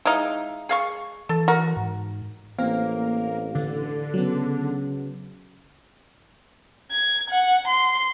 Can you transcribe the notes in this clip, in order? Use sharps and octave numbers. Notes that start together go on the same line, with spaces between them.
G#3 D#4 E4 F5
G#4 F5 C#6
E3 A4
F#4 A#4
G#2
A1 A#3 C4 F5
D3
C#3 F#3 B3
G#6
F#5
C6